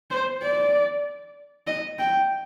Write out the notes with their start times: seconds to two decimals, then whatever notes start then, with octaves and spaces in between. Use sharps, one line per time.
0.11 C5
0.42 D5
1.67 D#5
1.99 G5